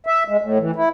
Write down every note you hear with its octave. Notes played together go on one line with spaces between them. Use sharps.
E5
G#3
A2
E3
E4